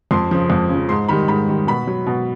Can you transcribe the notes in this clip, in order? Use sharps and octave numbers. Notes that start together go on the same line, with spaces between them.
F2 C6
C#3 F3
F2
C#3 F3
G#2 C6
D#3 G3 B5
G#2 B5
D#3 G3
B2 B5
F#3
B2